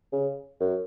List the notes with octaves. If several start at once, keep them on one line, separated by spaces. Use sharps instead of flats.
C#3
F#2